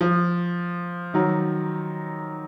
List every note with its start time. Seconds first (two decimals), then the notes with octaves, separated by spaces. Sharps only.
0.01 F3
1.14 D#3 F#3